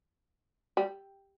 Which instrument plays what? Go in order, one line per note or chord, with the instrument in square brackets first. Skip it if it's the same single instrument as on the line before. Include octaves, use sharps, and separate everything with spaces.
[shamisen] G3